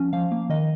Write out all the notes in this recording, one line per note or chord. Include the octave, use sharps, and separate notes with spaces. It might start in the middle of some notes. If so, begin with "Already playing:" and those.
Already playing: F3 C#4
F3 F5
A#3
D#3 D#5